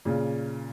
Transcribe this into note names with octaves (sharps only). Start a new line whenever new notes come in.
A#2 C#3